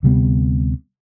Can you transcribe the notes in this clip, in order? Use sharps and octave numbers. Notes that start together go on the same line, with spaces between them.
D2 C3 G3 B3